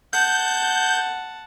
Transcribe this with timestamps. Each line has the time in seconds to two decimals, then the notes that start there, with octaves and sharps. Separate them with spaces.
0.13 F#5 A5 G6